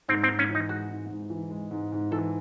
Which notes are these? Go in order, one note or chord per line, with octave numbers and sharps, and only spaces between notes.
G#2 C4
C4
G#2
C#4
E3
D#4
G#3 F#4
G#2
G#2
E3
G#3
G#2
G#2
E3 A4